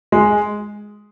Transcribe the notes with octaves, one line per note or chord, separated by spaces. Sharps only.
G#3